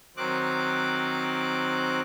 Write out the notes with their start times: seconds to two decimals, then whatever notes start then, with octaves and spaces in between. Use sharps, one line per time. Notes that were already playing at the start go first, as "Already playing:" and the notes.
0.17 D#3 F#3 C4 D6 F#6